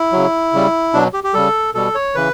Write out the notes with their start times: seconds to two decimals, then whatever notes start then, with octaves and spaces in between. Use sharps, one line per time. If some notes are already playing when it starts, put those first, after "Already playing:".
Already playing: E4
0.12 C#3 F#3
0.53 C#3 G3
0.93 B2 F#3 D4
1.14 G4
1.24 G4
1.34 C#3 G3 A4
1.74 B2 G3 A4
1.95 C#5
2.15 C#3 E3 B4